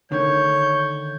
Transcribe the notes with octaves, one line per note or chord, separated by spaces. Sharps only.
D3 D#3 A3 C#5 G6